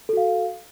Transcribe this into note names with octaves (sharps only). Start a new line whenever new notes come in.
F#4 A4 F5